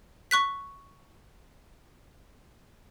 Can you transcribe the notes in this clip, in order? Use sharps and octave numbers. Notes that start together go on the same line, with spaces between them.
C#6 F#6 B6